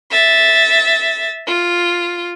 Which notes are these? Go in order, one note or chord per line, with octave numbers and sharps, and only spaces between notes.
E5 A6
F4